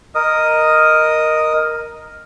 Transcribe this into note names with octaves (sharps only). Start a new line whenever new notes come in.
A#4 D#5 D#6